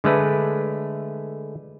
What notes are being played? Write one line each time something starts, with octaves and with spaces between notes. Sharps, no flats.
D3 G#3 A3 B4